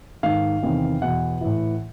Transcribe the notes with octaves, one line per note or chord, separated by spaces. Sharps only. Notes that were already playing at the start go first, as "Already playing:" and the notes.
G#2 D#3 F5
E2 C3 D#3
E2 B2 F#5
A2 E3